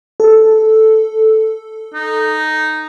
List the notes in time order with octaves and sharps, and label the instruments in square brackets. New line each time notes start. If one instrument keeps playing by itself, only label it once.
[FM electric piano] A4
[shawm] D#4